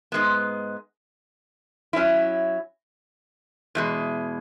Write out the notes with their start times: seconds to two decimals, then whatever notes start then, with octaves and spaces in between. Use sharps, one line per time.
0.12 G#2 G#3 B3
1.93 F#3 C#4 E4
3.75 E2 B2 G#3